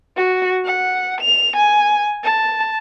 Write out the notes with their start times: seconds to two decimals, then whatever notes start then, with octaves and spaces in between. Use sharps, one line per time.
0.17 F#4
0.65 F#5
1.21 F7
1.56 G#5
2.23 A5